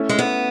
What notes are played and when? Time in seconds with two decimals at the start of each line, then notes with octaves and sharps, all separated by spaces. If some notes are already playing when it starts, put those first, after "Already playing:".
Already playing: A3 C#4 E4 A4 C#5
0.09 G#3
0.19 B3